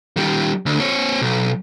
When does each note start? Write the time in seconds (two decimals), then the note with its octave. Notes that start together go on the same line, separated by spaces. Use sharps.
0.17 D#3 G3
0.66 D2
0.79 C4 C#5
1.21 B1